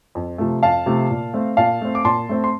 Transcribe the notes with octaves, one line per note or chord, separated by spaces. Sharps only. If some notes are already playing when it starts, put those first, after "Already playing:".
F2
C3 F3 A3
F2 F5 A5
C3 F3 A3
A#2
A3 C4
A#2 F5 A5
A3 C4
D6
A#2 A5 C6
A3 C4
C6